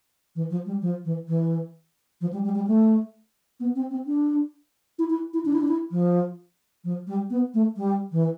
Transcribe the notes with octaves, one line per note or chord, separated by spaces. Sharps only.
E3
F3
G3
F3
E3
E3
F3
G3
G3
G3
A3
B3
C4
C4
D4
E4
E4
E4
D4
E4
D4
E4
F3
F3
G3
B3
A3
G3
E3